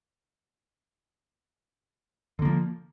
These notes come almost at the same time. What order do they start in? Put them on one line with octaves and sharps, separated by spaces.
D3 A#3 F3